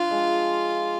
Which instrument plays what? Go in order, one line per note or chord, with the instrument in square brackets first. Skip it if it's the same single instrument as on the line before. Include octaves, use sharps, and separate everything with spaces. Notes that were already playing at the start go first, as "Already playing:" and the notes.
Already playing: [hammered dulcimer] F3 D4 [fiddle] F4
[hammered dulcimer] G#3